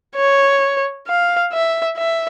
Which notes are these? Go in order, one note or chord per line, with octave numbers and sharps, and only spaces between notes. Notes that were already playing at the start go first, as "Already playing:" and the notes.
C#5
F5
E5
E5